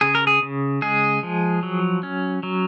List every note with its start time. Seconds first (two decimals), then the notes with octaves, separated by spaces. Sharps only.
0.01 C#3 G#4
0.15 A#4
0.27 G#4
0.43 C#3
0.82 G#3 G#4
1.23 F3
1.63 F#3
2.03 C#4
2.43 F#3